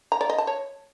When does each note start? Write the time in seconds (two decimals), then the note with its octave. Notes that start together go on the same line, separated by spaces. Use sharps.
0.12 A#5
0.21 D5
0.30 D#5
0.38 A5
0.47 C#5